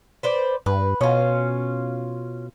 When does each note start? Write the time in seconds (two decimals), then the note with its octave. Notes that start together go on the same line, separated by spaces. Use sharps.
0.23 B4 C5 D5
0.66 G2 B4
1.01 B2 C#4 F4